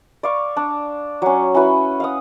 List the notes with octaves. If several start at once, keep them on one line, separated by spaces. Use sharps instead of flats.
D5 F5 C#6
D4
F#3 C#4
C#4 E4 F#4 B4
F5 F#5 D#6